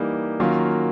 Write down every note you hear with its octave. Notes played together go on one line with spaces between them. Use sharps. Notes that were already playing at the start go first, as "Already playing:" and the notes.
Already playing: E3 G3 A#3 D#4 G4
D#3 F#3 A#3 C#4 F4